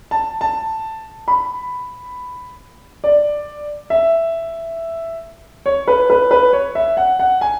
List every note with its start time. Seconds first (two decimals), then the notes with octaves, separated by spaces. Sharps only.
0.11 A5
0.41 A5
1.28 B5
3.04 D5
3.90 E5
5.66 C#5
5.88 B4
6.10 B4
6.31 B4
6.53 C#5
6.75 E5
6.97 F#5
7.19 F#5
7.41 G#5